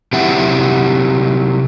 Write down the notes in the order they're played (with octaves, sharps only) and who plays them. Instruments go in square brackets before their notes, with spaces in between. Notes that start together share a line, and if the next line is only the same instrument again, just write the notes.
[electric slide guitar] C3 F#3 E4 G4 E5 F#5